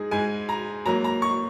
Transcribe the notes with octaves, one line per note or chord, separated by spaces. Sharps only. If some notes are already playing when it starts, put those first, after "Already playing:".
Already playing: G#2 G#3 D#4 G#4
G#2 G#3 G#5
A#5
G#2 F#3 A#3 A#5
A#5
C#6